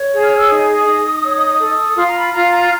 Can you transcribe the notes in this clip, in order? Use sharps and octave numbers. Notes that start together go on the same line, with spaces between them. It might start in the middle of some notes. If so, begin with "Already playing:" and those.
Already playing: C#5
G#4
F6
E6
D#4 D#6
D#4
C#5
A4
F4 C6
A#5
B5
F4 A#5
A#5